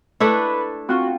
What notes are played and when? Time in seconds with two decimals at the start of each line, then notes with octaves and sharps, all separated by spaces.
0.20 A3 D4 E4 B4
0.89 C4 F4 F#4